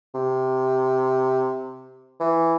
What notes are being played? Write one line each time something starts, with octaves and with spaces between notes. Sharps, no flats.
C3
E3